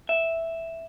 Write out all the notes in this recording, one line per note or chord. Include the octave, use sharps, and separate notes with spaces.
E5